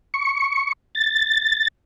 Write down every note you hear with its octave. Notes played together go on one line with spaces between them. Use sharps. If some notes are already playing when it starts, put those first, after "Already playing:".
C#6
A6